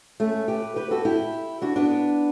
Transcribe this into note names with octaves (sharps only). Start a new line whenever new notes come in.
A3 C#4
G4 B4
G4 B4
F#4 A4
E4 G4
D4 F#4
B3 D4